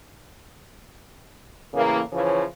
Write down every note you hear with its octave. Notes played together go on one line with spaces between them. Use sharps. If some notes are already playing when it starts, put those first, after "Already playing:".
A2 C#3 E3 A#3
C#3 E3 F3 C#5